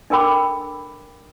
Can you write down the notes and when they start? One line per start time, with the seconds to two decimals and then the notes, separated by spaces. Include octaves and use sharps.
0.10 D4 A4 A#4 G5 B5 D6